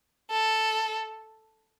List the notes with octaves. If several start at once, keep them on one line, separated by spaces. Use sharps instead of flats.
A4